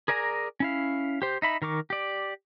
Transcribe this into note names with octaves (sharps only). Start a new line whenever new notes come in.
G#4 A#4 D5 G#5 A#5
C#4 E4 F5
G4 C5
D#4 E5 B5
D#3 A#4 C#6 D6
G4 D5